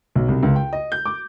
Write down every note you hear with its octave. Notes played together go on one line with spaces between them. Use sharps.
B1
C2
C#2
G5
D#5
G6
D6